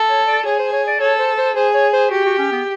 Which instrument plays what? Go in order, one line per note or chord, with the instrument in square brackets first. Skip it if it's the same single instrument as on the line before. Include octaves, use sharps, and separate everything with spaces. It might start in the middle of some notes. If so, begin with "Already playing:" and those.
Already playing: [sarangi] A4
[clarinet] C#5
D5
[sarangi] G#4 [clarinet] C#5
[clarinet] C5
C#5
D5
[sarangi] A4 [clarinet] C#5
[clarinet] C5
C5
[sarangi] G#4 [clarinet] C5
[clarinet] C#5
C5
[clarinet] F#4 [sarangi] G4
[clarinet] F#4
C#4
B3